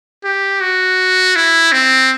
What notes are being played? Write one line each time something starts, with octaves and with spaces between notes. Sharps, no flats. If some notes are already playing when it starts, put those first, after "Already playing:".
G4
F#4
E4
C4